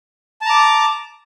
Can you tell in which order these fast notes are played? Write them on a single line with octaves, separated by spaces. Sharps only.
A5 A#5 D6